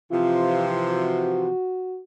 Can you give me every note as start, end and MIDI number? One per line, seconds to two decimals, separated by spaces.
0.12 1.49 48
0.12 1.49 52
0.12 1.49 53
0.12 0.70 65
0.90 2.00 66